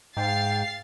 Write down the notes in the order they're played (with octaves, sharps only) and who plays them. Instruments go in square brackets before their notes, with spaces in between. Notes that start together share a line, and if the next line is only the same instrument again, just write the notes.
[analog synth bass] G#2 [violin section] F5 A6 C7 [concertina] G5